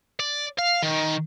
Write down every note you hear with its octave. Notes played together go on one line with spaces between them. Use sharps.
D5
F5
D#3